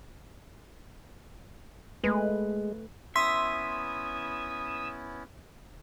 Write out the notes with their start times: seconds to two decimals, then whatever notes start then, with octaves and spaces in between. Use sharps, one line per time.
2.04 G#3 A3 B4
3.15 B3 C#4 E4 E5 C6 D#6 B6